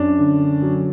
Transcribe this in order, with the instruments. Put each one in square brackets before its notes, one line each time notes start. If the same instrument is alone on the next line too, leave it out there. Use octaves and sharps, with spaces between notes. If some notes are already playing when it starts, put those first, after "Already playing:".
Already playing: [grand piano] F#2 D4
D3
F#3